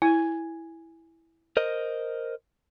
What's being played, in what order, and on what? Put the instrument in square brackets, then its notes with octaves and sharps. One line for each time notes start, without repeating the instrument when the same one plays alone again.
[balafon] E4 [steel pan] G#5
[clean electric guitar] A#4 C5 D#5